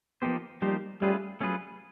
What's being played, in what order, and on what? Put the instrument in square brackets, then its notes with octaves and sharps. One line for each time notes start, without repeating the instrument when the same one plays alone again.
[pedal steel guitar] F3 A#3 D#4 G4 C5 [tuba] B3
[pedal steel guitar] F3 A#3 D#4 G4 C5 [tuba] G3
[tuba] G3 [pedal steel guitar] A3 C#4 F4 G#4 B4
[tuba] F#3 [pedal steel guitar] A3 C#4 F4 G#4 B4